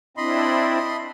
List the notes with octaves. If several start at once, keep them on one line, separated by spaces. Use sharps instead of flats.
C4 D4 E4 D#5 B5 C6